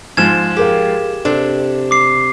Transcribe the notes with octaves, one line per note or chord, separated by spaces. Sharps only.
G#2 F3 G#6 E7
G4 G#4 A#4 F5
C3 D4 A4
D6 C7